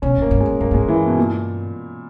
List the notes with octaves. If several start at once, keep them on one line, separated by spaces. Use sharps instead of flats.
B2 C#4
A#2 A#3
G2
G#3
G#2
G2 A#3
G#2 G#3
G2
E3
B2
A#2